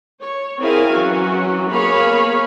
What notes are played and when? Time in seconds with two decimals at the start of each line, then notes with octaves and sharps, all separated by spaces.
0.21 C#5
0.60 C4 E4 G#4 A#4 F5 G#5
0.92 E3 F#3 C#4 F#4
1.70 A#3 B3 G#4 C#5 F5 B5